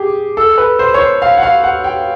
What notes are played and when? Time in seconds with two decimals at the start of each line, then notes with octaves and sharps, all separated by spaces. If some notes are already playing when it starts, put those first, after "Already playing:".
Already playing: G4 G#4
0.37 A4
0.58 B4
0.79 C5
0.94 C#5
0.99 C5
1.22 F5
1.38 F#5
1.43 F5
1.64 F#5
1.84 G5